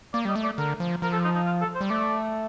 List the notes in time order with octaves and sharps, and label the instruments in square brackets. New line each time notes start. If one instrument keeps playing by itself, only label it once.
[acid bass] A#3 [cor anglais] D5
[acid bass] G3 [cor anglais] D#5
[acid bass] A3
[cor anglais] D5
[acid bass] D3 [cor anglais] A#4
[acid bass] F3
[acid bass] F3 [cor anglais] A#4
[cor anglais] A4
D#4
D#4
F4
A4
C5
[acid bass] G3
[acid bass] A3 [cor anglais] D5